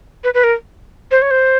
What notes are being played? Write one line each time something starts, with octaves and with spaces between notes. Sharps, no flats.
B4
B4
A#4
C5
C#5
C5